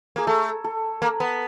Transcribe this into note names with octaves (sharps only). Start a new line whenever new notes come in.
A#3 G#4
A3 A4
A4
A#3
B3